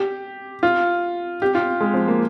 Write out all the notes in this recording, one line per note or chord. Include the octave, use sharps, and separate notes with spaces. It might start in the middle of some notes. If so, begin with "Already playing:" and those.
Already playing: G4
F4
G4
F4
G#3
F3
A#3